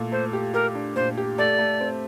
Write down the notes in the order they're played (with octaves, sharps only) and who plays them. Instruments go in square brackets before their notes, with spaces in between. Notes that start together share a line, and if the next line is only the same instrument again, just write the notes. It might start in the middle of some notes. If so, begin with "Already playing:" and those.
Already playing: [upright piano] A#2 A3
[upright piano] A3 [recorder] C5
[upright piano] G4
[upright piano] G4 [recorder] A#4
[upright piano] D4
[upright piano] A#2 [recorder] C5
[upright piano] G4
[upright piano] A3 [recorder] D5
[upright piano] A3
C4